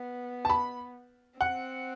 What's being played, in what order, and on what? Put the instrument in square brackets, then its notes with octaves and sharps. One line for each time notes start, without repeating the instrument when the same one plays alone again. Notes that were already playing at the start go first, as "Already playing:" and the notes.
Already playing: [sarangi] B3
[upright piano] A5
B5
[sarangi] C4 [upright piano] F#5